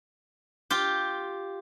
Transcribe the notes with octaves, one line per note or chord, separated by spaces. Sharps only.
F4 G4